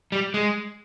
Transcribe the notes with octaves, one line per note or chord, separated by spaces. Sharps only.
G3
G#3